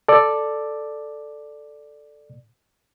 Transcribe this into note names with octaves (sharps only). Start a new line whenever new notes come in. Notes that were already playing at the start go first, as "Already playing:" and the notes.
A4 D5